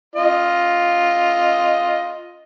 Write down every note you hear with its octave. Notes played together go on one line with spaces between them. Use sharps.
F4 D#5